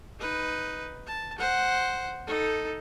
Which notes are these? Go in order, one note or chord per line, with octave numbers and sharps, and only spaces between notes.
D#4 B4
A5
C5 F#5
D#4 A4